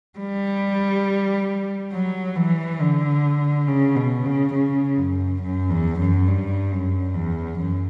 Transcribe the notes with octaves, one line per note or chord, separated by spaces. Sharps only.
G3
F#3
E3
D3
C#3
B2
C#3
C#3
F#2
F#2
E2
F#2
G2
F#2
E2
F#2